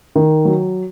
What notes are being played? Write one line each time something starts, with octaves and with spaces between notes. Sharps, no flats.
D#3
F#3